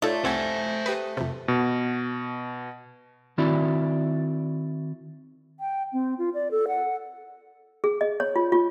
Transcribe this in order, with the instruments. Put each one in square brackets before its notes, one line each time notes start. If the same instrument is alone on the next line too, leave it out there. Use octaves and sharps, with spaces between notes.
[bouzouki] A3 [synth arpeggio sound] D#4 A4 [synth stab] F4 C#5 D5
[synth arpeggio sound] C2 C4 F#5 [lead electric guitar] C5 G#5 [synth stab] G6 G#6
[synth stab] G4 D#6 C#7 [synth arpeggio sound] B4
[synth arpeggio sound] F2 C3
[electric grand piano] B2
[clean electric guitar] D#3 C4 E4 F#4 D5 E5
[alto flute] G5
C4
F4
D5
A4
F#5
[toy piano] G#4
D#5
C#5
F4
F4